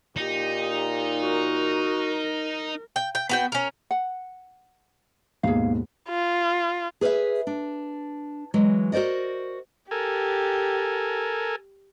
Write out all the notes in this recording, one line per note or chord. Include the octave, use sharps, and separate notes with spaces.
A#2 D#4 G4
F#4 A#4
G5
G5
B3 F#4 G5
C#4 A#4
F#5
D#2 G#2 B2 G#4 F5
F4
G#4 B4 C#5 E5
D4
E3 F#3 G#3
F#4 A#4 C5 D5 D#5
G4 A4 A#4 G#5